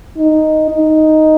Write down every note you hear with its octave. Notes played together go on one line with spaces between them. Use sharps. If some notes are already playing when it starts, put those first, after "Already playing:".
D#4
D#4